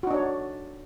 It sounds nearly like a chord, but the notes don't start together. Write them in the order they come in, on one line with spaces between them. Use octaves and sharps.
F#4 D#4 D4 C#5